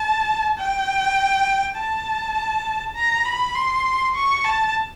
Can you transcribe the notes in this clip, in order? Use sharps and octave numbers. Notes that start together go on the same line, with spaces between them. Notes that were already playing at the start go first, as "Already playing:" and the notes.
Already playing: A5
G5
A5
A#5
B5
C6
C#6
A5